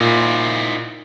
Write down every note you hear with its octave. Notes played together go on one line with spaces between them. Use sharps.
A#2 D#4 E4 C5